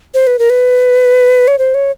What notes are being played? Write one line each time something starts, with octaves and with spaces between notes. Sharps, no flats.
C5
B4
A#4
B4
C#5
C5
C#5